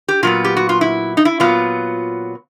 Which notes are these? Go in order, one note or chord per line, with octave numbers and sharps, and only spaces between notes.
G4
A#2 F#3 B3 F4
G4
F#4
F4
E4
D#4
E4
A#2 F#3 B3 F4